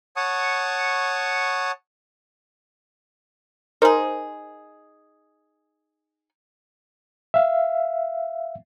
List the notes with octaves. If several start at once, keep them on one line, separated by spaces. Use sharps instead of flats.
C#5 F#5 A5 C#6 D#6
D#4 G#4 A#4 C5
E5 F5